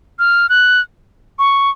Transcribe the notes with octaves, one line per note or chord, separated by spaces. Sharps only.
F6
F#6
C#6